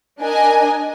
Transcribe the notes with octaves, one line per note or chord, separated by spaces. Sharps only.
D4 A#4 D#5 G#5